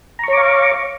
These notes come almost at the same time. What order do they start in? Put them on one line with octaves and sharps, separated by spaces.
A#5 C#6 C#5 D6 F5